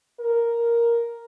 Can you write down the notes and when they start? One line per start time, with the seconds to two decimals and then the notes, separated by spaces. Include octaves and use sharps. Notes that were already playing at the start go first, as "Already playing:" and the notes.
0.20 A#4